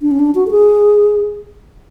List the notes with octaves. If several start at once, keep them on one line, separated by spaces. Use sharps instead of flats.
D4
C#4
D4
F#4
A4
G#4